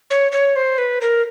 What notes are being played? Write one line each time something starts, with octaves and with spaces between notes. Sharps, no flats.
C#5
C#5
C5
B4
A#4